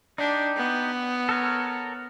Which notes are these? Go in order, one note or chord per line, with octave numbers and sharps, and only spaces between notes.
D4 D#4 G4
B3
A4 A#4 C#5